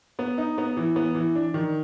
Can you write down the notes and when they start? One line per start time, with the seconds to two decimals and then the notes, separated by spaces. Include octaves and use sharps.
0.19 B3
0.38 D#4
0.58 B3
0.77 E3
0.96 B3
1.15 E3
1.35 D4
1.54 D#3